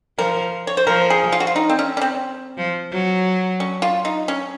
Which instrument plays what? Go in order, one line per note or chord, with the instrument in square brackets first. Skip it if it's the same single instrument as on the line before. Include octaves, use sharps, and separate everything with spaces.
[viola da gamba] F3 [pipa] A#4
[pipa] C#5
C5
[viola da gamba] F3 [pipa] A#4
[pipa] G#4
F4
F#4
F4
D#4
C4
C#4
C#4
C4
[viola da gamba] F3
F#3
[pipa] C#4
F4
D#4
C#4